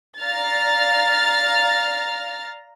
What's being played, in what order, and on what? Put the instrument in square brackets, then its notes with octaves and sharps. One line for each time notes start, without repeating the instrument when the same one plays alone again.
[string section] D5 F5 A#5 F6 A6